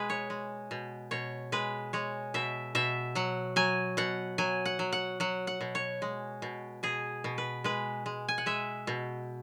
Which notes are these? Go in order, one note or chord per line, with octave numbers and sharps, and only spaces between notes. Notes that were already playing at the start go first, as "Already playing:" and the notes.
Already playing: B2 G#3 G#4 B4
C#5
G#3
B2
B2 C#5
G#3 B4
G#3 C#5
B2 E5
B2 E5
F#3 F#5
F#3 G#5
B2 F#5
F#3 G#5
F#5
F#3
F#5
F#3 F#5
F#5
B2
C#5
G#3
B2
B2 G#4
B2
B4
G#3 B4
G#3
G#5
F#5
G#3 E5
B2